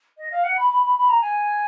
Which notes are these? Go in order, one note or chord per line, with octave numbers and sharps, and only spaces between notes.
D#5
F5
F#5
B5
B5
B5
B5
A#5
G#5